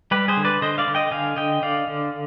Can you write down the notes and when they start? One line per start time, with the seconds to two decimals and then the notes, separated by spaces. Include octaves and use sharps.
0.11 G3 G4 B4
0.28 G#4 C5
0.37 D3
0.45 B4 D5
0.62 D3 C5 D#5
0.78 D5 F5
0.87 D3
0.95 D#5 G5
1.11 D3 F5 G#5
1.36 D3 D#5 G5
1.62 D3 D5 F5
1.87 D3